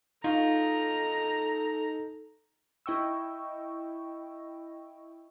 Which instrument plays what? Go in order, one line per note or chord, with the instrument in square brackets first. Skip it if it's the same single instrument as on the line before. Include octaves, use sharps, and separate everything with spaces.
[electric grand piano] D#4 [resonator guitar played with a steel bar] F4 [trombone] A4 [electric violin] A#5
[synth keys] E4 D#5 G5 C#6 E6